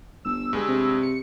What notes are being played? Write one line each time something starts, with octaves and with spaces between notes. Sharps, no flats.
G1 E6
G2 G#3 G#4
C3
C#7